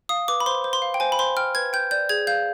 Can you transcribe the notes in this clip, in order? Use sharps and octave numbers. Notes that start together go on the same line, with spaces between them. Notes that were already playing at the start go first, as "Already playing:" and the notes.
F5 D#6
B4 D6
B5
C5 C6
C5
C6
F5
G5
C5 G#5
B5
C5 C6
G5 F6
B4 G#6
G5 G6
D5 G6
G#4 G#6
F5 G6